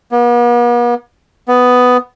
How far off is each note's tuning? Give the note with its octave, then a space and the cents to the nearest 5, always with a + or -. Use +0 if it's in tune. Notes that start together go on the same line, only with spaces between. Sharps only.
B3 -45
B3 +10